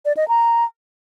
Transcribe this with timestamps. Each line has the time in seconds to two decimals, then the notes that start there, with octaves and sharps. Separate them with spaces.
0.05 D5
0.17 D#5
0.28 A#5